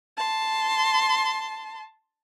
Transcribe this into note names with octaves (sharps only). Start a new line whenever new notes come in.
A5 C6